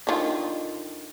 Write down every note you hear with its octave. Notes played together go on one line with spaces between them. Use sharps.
D3 D#3 F4